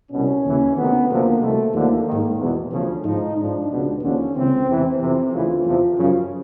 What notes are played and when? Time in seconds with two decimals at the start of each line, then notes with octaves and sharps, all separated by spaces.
0.11 C2 B2 C#4
0.44 D#2 C#3 E3
0.76 D2 C3 D#3 B3
1.08 D2 C3 F3 A#3
1.41 C2 B2 A3
1.74 D#2 D3 F3 A#3
2.06 G#2 D#3
2.39 E2 B2
2.72 D2 C#3 F3
3.04 G#2 F3 D#4
3.37 G#2 F3 D4
3.69 C#2 B2
4.01 D#2 D3 F3 C#4
4.34 C#2 C#3 E3 C4
4.67 E2 C3 E3 C4
4.99 F2 C3 E3 C4
5.32 D2 C#3 E3 F4
5.65 E2 C3 F3
5.98 F#2 C#3 F3